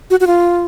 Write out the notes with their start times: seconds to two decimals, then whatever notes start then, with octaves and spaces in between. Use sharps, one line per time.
0.10 F#4
0.20 F#4
0.27 F4